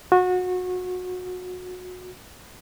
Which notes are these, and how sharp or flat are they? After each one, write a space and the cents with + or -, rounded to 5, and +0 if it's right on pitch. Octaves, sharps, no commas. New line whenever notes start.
F#4 -25